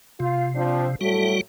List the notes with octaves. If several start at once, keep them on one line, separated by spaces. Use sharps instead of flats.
C3 F4
F3 C4 D4
A2 F#3 G3 F#4 A4